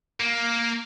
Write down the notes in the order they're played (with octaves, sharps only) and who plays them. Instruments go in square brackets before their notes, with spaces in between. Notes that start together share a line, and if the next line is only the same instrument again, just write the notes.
[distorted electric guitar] A#3